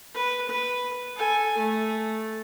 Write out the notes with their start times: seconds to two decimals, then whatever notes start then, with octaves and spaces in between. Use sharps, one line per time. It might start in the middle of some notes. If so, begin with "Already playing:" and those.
0.14 B4
0.49 B4
1.15 A4 G#5
1.57 A3